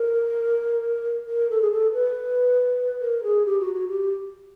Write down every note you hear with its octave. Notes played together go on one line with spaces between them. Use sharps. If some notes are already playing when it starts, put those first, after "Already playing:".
Already playing: A#4
A#4
A4
G#4
A4
B4
A#4
G#4
G4
F#4
F#4
G4